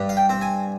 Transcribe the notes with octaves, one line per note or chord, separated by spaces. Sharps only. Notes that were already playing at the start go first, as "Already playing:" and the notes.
Already playing: G2
F5
G5
C4
G#5